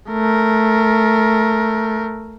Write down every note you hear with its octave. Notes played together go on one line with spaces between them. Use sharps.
A3 A#4